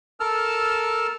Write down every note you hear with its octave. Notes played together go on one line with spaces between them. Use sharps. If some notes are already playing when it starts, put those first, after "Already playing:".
A4 A#4 A5 E6 F6